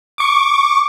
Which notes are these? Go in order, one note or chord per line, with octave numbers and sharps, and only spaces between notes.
C#6 D6